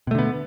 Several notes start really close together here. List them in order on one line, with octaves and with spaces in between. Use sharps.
B2 A3 D3 B3